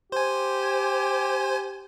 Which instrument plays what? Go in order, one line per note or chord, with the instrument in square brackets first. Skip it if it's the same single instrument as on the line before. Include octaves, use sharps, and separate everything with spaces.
[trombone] G4 [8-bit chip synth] C5 G#5